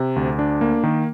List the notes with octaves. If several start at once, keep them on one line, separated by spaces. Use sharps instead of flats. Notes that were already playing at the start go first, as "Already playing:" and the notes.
Already playing: C3
D2
D4
A#3
D#3